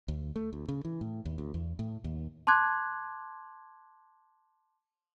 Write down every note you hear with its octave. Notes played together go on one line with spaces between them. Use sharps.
D2
A3
D2
C#3
E3
A2
D#2
D2
E2
A2
D#2
A5 C6 D6 F#6 G#6